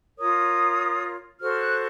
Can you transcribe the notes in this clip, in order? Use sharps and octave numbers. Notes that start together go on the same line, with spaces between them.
F4 A#4 C#5 D#6
F#4 A4 C5 F6
F#6